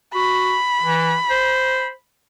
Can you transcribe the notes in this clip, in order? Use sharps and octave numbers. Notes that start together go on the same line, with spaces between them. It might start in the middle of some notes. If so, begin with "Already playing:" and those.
F#4 B5
E3
C5